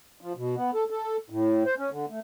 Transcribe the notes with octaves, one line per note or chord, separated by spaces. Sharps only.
F3
B2
B3
A4
A4
A2
C5
C#4
D3
A3